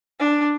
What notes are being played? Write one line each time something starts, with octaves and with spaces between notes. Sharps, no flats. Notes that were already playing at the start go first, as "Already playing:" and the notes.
D4